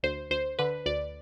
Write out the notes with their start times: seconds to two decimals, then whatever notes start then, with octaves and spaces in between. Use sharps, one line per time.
0.03 D2 C5
0.30 D2 C5
0.59 D3 B4
0.86 D2 D5